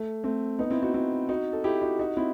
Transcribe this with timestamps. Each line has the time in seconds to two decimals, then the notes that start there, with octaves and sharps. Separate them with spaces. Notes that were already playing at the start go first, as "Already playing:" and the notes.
Already playing: A3
0.24 A3 C4
0.59 B3 D#4
0.70 C4 E4
0.83 D#4 F#4
0.94 C4 E4
1.29 D#4 F#4
1.53 A4
1.64 E4 G4
1.82 D#4 F#4
1.99 D#4 F#4
2.17 C4 E4